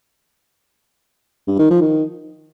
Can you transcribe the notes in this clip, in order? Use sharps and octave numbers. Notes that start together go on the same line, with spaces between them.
G2
D#3
F3
D#3